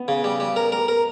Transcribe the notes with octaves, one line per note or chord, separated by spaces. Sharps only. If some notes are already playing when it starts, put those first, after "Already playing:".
Already playing: B3
C#3
G3
G3
A#4
A#4
A#4